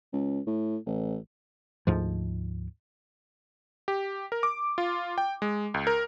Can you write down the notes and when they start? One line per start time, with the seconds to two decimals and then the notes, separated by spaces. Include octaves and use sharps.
0.13 C#2
0.47 A2
0.86 A1
1.87 D2 G#2 F3
3.88 G4
4.32 A#4
4.43 D6
4.78 F4
5.18 G5
5.42 G#3
5.74 C#2
5.87 A#4